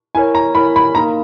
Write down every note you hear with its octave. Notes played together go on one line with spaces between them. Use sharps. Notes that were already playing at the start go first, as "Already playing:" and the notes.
E4 A#4 C#5 G#5
A#5
E4 A#4 C#5 B5
B5
A#3 D#4 A#4 A#5